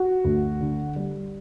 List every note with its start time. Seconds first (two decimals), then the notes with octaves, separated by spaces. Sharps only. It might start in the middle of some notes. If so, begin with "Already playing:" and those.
Already playing: F#4
0.24 D2
0.60 D3
0.96 G3